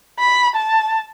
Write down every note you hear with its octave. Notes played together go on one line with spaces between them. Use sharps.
B5
A5